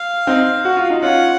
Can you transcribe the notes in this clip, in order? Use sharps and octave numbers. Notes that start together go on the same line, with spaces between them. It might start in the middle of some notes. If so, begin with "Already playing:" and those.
Already playing: F5
C4 D#4
F#4
F4
D#4
C#4 F4 F#5